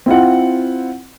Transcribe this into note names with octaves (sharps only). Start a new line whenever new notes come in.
C4 E4 F4 F#5